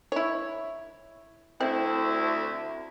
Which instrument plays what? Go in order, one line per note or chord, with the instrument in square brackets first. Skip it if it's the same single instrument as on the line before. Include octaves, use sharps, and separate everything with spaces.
[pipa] E4 C#5
[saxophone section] D2 E4 [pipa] C4